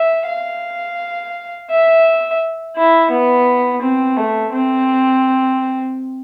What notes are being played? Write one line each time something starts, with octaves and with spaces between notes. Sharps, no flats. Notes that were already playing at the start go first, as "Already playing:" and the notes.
Already playing: E5
F5
E5
E4
B3
C4
A3
C4